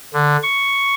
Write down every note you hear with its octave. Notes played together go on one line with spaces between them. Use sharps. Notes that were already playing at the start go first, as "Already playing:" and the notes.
D3
C#6